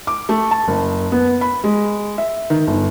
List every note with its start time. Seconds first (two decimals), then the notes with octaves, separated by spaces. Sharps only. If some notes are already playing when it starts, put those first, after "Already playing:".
0.07 D6
0.29 A3
0.51 A5
0.68 F#1
1.12 B3
1.41 B5
1.64 G#3
2.18 E5
2.50 D#3
2.67 G1